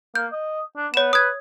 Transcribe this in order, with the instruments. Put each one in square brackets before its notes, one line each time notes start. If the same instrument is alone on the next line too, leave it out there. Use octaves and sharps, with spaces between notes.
[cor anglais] A#3 [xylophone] G6
[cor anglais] D#5
D4
[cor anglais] B3 [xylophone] C#5 E7
[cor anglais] B4 [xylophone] D#6 G#6